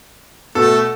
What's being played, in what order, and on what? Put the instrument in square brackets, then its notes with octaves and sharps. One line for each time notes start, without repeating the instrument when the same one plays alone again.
[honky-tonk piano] B2 [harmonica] A3 [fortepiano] A4